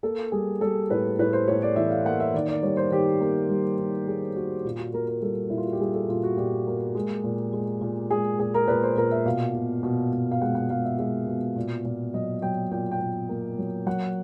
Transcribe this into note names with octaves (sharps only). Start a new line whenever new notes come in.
A#3 A4
G3 G#4
G3 A4
A2 B4
A2 B4
C5
A2 C#5
D5
E3 E5
F5
A#3 F#5
E5
D#3 D5
D5
G3 C#5
C5
D#3 G4
A#3
G3
D#3
A#3 G#4
A#3 F#4
A#2 F4
F#4
A#3 A#4
A#4
G3 A4
A#2 E4
F4
F#4
G4
G3 G#4
A4
A#2 F4
F#4
A#2 G4
A#3
G#3
A#2
G#3
A#2
G#3 G#4
A#2 G#4
A#4
A#2 B4
C5
A#2 A#4
E5
B2 F5
B2
B2
B2
F5
G#3 F#5
F#5
G#3 F5
E5
G#3 E5
B2
A#2
A#2
F#3 D#5
F#3 G5
A#2 G5
G5
A#2
A#3
F#3
F#3 F#5